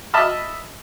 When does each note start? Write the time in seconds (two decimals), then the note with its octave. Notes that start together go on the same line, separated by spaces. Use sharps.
0.14 D#5 E5 A5 B5 F6